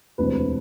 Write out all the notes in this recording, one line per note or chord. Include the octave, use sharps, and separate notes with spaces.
E1 D2 C3 E3 B4
C5
B4